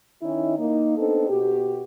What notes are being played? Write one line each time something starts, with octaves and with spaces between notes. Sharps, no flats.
D#3 C#4 D#4 E4
A#3 D#4
B3 C4 D4 D#4 A4
B2 F#4 G4